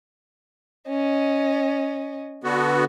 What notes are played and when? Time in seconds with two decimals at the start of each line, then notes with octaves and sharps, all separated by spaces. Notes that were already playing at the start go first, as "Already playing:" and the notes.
0.88 C#4 D#5
2.44 D3 B3 F#4